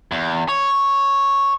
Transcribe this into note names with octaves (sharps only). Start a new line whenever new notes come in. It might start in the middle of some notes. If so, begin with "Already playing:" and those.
E2
C#5